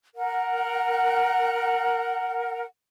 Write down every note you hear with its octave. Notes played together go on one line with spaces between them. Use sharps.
A#4 F#5